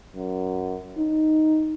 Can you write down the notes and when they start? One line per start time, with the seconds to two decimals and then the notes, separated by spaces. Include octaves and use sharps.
0.15 F#2
0.97 D#4